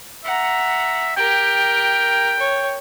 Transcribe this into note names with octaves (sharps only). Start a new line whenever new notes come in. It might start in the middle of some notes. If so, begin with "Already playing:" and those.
E5 F#5 A#5
G4 A#4 G5
C#5